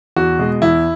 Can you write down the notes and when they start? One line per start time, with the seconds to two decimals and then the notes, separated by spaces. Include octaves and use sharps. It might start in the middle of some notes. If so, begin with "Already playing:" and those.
0.16 E2 F#4
0.39 B2 G#3
0.62 E2 E4